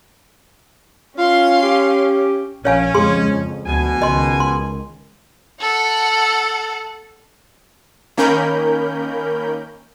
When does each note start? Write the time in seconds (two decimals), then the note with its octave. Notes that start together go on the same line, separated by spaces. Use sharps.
1.18 C#4 F4 F5 C6
1.62 G4
2.65 A#1 C#4 C#5 F5 G#5
2.95 F2 C#3 G#3 G#4 C6
3.29 F2
3.66 D2 B2 G#5
4.02 C#2 D#3 D#5 C6
4.40 C6
5.60 A4 F#5
8.17 D#3 A#3 C#4 A#4 B5 G6